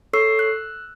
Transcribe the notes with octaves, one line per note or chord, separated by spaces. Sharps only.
A4 C#5 C#6 E6 C7
E6 F#6